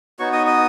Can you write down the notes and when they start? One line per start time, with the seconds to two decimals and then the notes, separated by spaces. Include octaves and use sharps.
0.19 B3 D#4 F#4 C#5 C#6
0.33 D#5 D#6
0.47 D#5 D#6